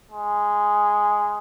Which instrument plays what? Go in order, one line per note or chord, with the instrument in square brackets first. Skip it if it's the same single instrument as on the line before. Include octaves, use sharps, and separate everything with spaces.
[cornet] G#3